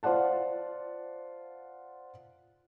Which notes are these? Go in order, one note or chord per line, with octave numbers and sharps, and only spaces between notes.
F4 C5 D5 F#5 A5